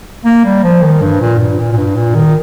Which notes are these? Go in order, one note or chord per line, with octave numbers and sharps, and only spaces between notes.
A#3
G3
F3
D#3
G2
A#2
G2
A#2
A#2
G2
A#2
D#3